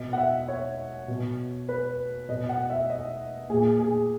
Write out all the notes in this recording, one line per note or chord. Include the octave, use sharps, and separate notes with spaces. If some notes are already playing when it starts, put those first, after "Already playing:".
Already playing: B2 D#5
F#5
E5
C#5
B2
B4
B2 D#5
F#5
E5
D#5
A#2 G#4
G#4